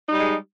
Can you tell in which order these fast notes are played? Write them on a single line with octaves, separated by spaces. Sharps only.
D#4 G3 G#3